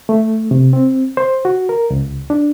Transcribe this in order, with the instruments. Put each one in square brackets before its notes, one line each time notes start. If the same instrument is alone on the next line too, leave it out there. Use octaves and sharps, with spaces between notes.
[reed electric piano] A3
C3
C4
C5
F#4
A#4
C#2
D4